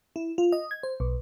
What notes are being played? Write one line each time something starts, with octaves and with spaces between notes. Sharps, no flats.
E4
F4
D#5
G#6
C5
B1